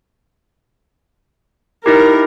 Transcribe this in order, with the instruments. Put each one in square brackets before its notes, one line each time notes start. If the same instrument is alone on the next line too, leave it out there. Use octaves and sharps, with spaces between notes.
[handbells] D#4 E4 G4 [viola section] A#4